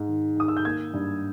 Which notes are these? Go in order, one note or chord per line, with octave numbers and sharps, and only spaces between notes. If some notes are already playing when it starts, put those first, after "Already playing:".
Already playing: G#2 G#3
D#3
D#3 D#6
E6
G6
A#3 G#6
G2